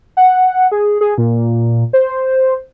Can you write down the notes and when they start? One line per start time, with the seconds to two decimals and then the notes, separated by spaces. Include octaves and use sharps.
0.17 F#5
0.72 G#4
1.01 G#4
1.18 A#2
1.93 C5